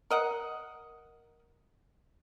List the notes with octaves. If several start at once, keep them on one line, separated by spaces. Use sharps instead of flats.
A#4 D#5 F#5